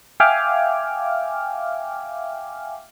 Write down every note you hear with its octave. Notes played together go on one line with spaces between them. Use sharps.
E5 F5 G5 G#5 D6 F6